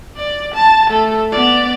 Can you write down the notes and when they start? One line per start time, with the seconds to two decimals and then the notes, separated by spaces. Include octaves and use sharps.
0.16 D5
0.55 A5
0.89 A3 A4
1.32 B3 D5